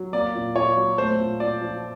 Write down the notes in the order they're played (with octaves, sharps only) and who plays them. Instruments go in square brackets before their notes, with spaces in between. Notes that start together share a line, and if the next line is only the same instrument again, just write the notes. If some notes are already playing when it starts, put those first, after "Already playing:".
Already playing: [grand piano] F#3
A#3 D5
A#2
A#2 C#5
F#3
A3 C5
A#2
A#2 D5
F3